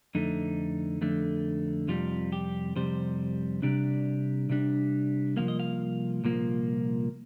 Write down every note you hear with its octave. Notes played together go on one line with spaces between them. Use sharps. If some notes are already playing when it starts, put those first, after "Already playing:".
F2 D3 A3 D#4
F2 D3 A3
F2 C3 G3 F4
G4
F2 C3 G3 C5
C3 G3 D4 D5
C3 G3 D4
C2 A#2 F3 A#3 F5
D#5
F5
C2 A#2 F3 A#3